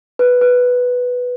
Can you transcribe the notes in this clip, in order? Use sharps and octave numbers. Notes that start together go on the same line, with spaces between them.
B4
B4